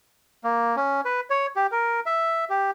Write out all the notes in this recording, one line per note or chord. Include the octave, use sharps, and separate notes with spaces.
A#3
C#4
B4
C#5
G4
A#4
E5
G4